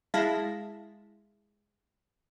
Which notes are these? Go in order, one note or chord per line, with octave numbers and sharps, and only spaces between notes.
G#3 E4 F5 A5 A#6 B6